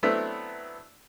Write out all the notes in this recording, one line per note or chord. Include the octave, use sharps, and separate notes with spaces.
F#3 A3 B3 C4 D4 E4